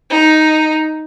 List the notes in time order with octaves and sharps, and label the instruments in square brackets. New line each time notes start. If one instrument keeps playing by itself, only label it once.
[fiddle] D#4